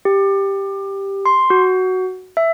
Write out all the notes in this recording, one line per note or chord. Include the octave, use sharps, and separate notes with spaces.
G4
C6
F#4
E5